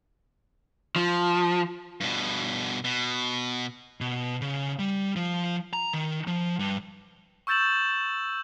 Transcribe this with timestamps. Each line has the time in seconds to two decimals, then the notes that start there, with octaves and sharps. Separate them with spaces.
0.96 F3
2.01 G2 B2
2.84 B2
4.01 B2
4.41 C#3
4.79 G3
5.16 F3
5.73 A#5
5.93 D#3
6.27 F3
6.59 G2
7.47 C#6 E6 G6 A6 E7 F#7